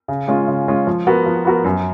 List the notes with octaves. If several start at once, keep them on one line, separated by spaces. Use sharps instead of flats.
C#3
G#3 C#4 F4
C#3
G#3 C#4 F4
F3
B3 F#4 A#4
F3
B3 F#4 A#4
F#2